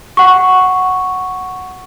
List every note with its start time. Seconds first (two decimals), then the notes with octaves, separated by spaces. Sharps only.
0.17 F#5 C#6